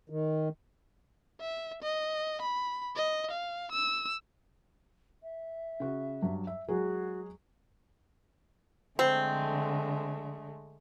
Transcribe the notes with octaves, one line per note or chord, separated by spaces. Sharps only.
D#3
E5
D#5
B5
D#5
F5
E6
E5
C#3 F#4
G2 F#3
E5
F#3 G#3 F#4 G#4
D3 G#3 A3 C4